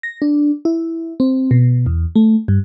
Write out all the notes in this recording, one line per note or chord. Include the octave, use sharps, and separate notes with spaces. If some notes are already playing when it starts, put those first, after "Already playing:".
A#6
D4
E4
C4
B2
E2
A3
G2